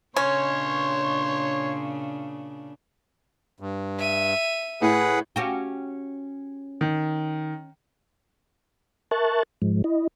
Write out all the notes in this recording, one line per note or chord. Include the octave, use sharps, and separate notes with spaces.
A#2 C#3 C#4 D4 C#5 C6 C#6
G2
E5 D#7
A2 G#4 B4 F#5
C#4 F#4 G4
D#3
A#4 E5 A5 C#6 F#6 A6
G#2 F3 G#3
E4 D#5